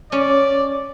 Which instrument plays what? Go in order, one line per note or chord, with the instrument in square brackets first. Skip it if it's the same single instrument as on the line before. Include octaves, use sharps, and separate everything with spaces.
[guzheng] C#4 [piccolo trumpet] D5